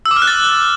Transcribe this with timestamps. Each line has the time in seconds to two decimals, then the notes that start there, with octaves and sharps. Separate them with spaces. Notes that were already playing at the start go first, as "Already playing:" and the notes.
0.06 E6
0.11 D6
0.16 F6
0.22 F#6
0.27 A6